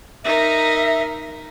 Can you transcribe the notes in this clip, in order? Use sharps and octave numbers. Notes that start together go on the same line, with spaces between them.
D#4 A#4 E5